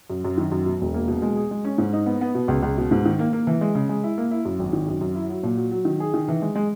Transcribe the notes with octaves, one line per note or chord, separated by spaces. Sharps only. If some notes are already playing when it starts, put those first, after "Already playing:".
F#2
F#2
D#3
F#2
B2
E1
A#3
B2
G#3
G#4
G#3
C#4
G#2
D#4
B3
B3
B2
C#2
C#2
B2
G#2
D#3
A#3
A#3
E3
G#3
C#3
G#3
E4
A#3
E4
F#2
G#1
D#3
F#2
F#2
E4
F#3
A#2
F#3
F#3
D#3
G#4
D#3
E3
G#3
G#3